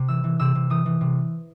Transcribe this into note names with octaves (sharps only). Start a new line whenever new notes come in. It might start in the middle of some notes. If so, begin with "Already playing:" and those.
Already playing: C3
E3 E6
E3
C3 E6
C3
E3 D#6
E3
C3